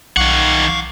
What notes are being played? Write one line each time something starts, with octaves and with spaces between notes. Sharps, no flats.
B1 D#3 F5 F#5 C#6 D6